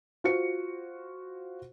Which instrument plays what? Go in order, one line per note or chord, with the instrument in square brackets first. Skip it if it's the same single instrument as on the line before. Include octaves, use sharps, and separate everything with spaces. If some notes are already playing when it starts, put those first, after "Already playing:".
[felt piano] F4 F#4 C5 C#7